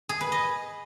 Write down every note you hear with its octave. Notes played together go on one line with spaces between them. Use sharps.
G#4
B4
D#5